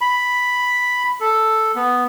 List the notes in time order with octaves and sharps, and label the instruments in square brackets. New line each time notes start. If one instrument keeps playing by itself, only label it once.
[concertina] B5
A4
B3